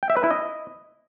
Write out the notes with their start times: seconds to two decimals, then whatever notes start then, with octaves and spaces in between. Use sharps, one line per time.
0.03 G5
0.10 E5
0.17 B4
0.24 E4
0.31 D#5